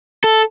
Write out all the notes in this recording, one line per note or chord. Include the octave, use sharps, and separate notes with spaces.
A4